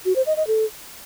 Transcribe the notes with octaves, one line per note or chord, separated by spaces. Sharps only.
F#4
C5
D#5
D#5
A4